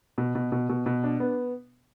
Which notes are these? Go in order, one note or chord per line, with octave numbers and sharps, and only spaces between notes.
B2
B2
B2
B2
B2
D4
B3